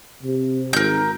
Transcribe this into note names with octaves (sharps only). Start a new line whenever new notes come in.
C3
G#1 A#4 G6